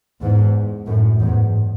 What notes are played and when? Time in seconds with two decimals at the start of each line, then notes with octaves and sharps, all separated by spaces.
0.21 E2 G#2
0.86 F#2 A2
1.19 E2 G#2